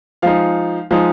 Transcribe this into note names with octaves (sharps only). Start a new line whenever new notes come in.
F3 G#3 D#4 F5
F3 G#3 D#4